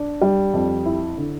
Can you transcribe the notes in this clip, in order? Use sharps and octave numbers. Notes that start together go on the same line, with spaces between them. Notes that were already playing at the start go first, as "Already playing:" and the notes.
Already playing: D4
G3
F2
E4
D3